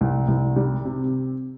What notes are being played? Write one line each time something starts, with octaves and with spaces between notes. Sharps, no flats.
C2
C2
G3
C3